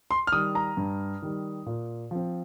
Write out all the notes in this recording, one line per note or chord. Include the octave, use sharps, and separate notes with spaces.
C6
F6
D#3 G3 D#6
A#5
G2
D#3 G3
A#2
F3 C4